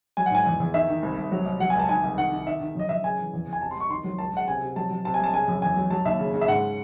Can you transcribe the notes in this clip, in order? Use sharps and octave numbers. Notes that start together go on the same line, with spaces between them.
F#3 G#5
F#5
G#2 G#5
E2
E2
D#3 E5
D#3
C2
C2
F#3
C2
F#3 F#5
G#5
C#2 A5
D#3 G#5
C2
D#3 F#5
D#3
D#3 E5
D#3
F#2 D#5
F#2 E5
C#3 G#5
E3
E2
E2
G#5
C3 A5
C6
C2 C#6
D#3 C6
F#3
C#2 A5
C#3 F#5
C3 G#5
C3
F#3 A5
F#3
C3 A5
G#5
C2 A5
C#3 G#5
F#2
E2 G#5
F#3
F#3 A5
D#2 E5
C#3
C#3
E5
G#2 F#5